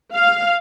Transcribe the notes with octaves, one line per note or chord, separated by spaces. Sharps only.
F5